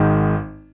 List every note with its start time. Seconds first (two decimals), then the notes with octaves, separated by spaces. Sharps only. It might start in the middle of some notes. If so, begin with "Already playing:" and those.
Already playing: G#1 G#2 D#3